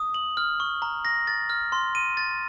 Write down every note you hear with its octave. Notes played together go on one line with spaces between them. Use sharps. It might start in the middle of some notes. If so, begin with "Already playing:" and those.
Already playing: D#6
F#7
F6
C#6
A#5
A#6
A6
F6
C6
D#7
A6